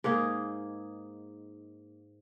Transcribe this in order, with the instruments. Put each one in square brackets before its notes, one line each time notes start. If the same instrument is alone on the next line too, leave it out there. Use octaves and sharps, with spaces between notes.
[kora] G#2 A#3 D#4 G#4